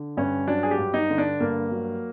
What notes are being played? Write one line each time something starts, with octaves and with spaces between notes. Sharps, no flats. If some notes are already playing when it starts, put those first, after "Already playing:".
Already playing: D3
G2 C#4
F#3 D4
G#4
G4
G2
D#4
D3
D4
G2 A#3
F#3